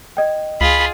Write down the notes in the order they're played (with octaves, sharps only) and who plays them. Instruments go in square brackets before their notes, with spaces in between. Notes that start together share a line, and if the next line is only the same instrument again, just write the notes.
[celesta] D#5 G5
[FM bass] C#2 [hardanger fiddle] F4 G#4 [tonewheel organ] B5